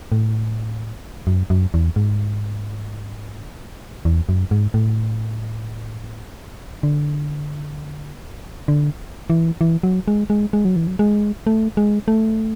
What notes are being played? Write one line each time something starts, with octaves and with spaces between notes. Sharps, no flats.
A2
F#2
F#2
E2
G#2
E2
F#2
G#2
A2
D3
D3
E3
E3
F#3
G#3
G#3
G#3
F#3
E3
F#3
G#3
A3
G#3
A3